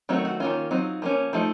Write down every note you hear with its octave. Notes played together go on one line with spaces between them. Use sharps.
D#3 F#3 A3 C4 D#4 F#4
F#4
D#3 A#3 C#4 F4
F#3 C4 D#4
F3 A#3 C#4
F3 A3 D#4